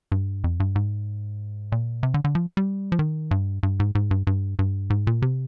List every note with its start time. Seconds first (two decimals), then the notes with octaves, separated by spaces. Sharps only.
0.12 G2
0.44 F2
0.60 G2
0.76 G#2
1.72 A#2
2.03 C3
2.14 D3
2.24 D3
2.35 F3
2.57 G3
2.92 F3
2.99 D#3
3.31 G2
3.63 G2
3.80 G#2
3.95 G#2
4.11 G2
4.27 G2
4.59 G2
4.90 G#2
5.07 A#2
5.22 C3